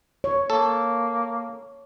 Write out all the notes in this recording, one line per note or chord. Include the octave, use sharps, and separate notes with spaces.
C#5
A#3 A4